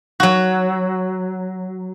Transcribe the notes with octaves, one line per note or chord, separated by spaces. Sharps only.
F#3 F#4